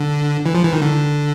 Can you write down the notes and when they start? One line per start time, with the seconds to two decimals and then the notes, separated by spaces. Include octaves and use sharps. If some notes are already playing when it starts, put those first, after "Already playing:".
Already playing: D3
0.46 E3
0.55 F3
0.64 E3
0.73 D#3
0.82 D3